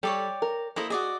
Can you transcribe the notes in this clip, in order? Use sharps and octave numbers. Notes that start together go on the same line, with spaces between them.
G3 A4 C#5 D5 G5
A#4
A#3 E4 A4 C5 D#5
F#4 G#4 D5 D#5